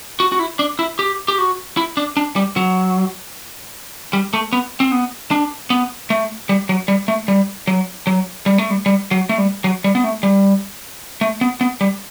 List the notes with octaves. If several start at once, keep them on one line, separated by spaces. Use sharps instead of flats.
F#4
F#4
E4
D4
E4
G4
G4
F#4
E4
D4
D4
G3
F#3
G3
A3
B3
C4
B3
D4
B3
A3
G3
F#3
G3
A3
G3
F#3
F#3
G3
A3
G3
G3
F#3
A3
G3
F#3
G3
B3
A3
G3
A3
B3
B3
G3